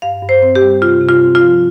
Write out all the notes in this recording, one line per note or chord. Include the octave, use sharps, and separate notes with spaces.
G2 F5
G2
C5
C4
G4
G3
C3 F4
C3
F4
C4
F4
F3